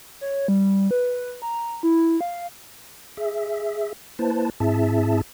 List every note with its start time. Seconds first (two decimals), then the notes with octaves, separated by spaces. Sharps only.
0.21 C#5
0.48 G3
0.91 B4
1.42 A#5
1.83 E4
2.21 F5
3.17 G#4 E5
4.19 A#3 E4 B4 C5 A5
4.60 G#2 C4 E4 G#4 E5 A5